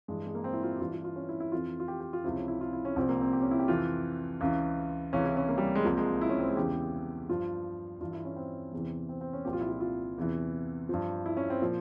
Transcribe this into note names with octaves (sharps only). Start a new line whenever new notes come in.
G2 E3 G#3
G#3
A#3
C4
E4
F4
G4
G2 E3 F4
F4
F4
C#4
E4
E4
F2 E3 F4
F4
G4
G4
F4
C#2 C3 F3 E4
C#4
E4
F4
E4
C#4
C2 C3 F3 C4
A#3
C4
G4
C#4
E4
G4
F2 C3 E3 F4
C#2 C#3 E3
C#2 C3 E3 C#4
E4
C#4
A#3
G3
G#3
C2 C3 F3 A#3
G#3
E4
C#4
C4
G#3
E2 C#3 E3 G4
G2 F3 F4
G2 E3 F4
E4
C#4
C4
E2 C3 E3
C4
C4
C#4
C2 A#2 F3 G4
F4
E4
F4
F4
E2 C3 E3
G2 F3
E4
C#4
C4
A#2 F3